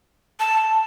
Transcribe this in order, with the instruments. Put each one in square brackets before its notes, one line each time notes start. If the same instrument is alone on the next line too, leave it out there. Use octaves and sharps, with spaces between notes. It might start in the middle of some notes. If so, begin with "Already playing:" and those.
[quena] A5